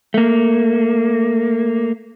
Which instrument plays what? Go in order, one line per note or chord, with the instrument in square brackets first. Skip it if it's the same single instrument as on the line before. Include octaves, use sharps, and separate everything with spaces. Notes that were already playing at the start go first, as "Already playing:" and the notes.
[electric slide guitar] A3 A#3